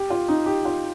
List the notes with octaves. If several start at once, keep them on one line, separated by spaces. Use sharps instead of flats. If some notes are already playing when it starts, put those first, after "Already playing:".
Already playing: G4
F4
D#4
G4
F4